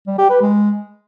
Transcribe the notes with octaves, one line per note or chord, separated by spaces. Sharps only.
G3
G4
B4
G#3